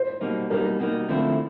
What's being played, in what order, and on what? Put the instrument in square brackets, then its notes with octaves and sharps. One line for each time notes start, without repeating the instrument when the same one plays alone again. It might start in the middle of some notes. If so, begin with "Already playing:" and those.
Already playing: [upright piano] C5
[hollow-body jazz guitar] B2 G3 A#3 D#4
[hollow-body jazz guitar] B2 G3 A#3 D#4 [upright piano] A#4
[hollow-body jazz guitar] B2 G3 A#3 D#4
D3 F3 A3 C4 E4